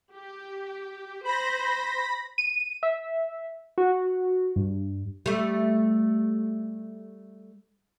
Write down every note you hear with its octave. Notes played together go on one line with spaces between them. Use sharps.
G4
C5 B5 A#6
D#7
E5
F#4
G2
G3 A3